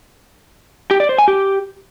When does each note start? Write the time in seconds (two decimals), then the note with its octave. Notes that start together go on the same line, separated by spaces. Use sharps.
0.91 G4
1.00 D5
1.09 C5
1.18 G#5
1.28 G4